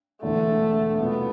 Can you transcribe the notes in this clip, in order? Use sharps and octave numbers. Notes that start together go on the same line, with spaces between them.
E1 E2 D3 A3
C2 B2 A3 B3 D4 F4